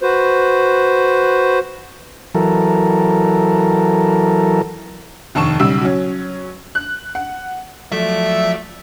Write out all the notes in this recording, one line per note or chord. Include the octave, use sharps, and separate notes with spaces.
F#4 B4 C5
E3 F#3 A4 A#4
F1 D#2 A5 C#6 E7
B1 C#3 G3 E6
F#3 C#4
F#6
F#5
F3 F#3 A3 D5 E5